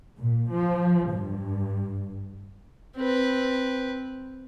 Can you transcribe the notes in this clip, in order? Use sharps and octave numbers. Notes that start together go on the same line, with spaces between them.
A#2
F3
G2
C4 B4